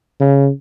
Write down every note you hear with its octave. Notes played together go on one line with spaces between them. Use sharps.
C#3